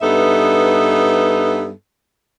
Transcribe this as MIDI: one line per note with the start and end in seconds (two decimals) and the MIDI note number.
0.02 1.70 43
0.02 1.70 59
0.02 1.70 63
0.02 1.70 69
0.02 1.70 76